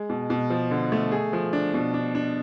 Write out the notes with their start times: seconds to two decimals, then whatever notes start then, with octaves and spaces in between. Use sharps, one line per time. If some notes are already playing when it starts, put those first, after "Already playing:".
Already playing: G#3
0.10 B2
0.30 B2
0.50 F3
0.71 D3
0.92 A3
1.12 G#4
1.33 F3
1.53 D4
1.74 B2
1.94 D4
2.15 D4